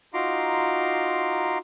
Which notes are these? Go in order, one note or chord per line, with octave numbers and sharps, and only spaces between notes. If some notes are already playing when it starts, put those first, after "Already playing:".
D#4 F4 F#4 A#5 C6 D6